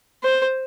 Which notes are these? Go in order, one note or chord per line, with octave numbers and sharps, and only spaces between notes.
C5